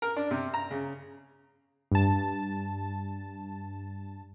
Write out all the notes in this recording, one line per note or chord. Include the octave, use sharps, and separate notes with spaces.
A#4
D4
C3
A#5
C#3
G2 A5